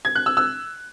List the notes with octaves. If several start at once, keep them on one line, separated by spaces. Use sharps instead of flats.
G#6
F#6
E6
E6